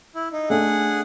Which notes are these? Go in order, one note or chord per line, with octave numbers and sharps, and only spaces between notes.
E4
D#4
A3 D4 G#4 A4 F#5